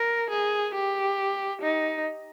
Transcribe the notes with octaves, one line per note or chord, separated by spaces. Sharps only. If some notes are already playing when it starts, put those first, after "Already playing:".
Already playing: A#4
G#4
G4
D#4